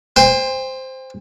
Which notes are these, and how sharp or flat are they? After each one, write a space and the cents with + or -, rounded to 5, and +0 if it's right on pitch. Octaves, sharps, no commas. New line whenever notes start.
C5 +0 G5 +40